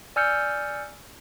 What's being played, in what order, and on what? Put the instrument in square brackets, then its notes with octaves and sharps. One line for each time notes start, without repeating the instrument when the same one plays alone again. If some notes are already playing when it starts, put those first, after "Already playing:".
[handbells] D5 G#5 E6 F6 G6 C#7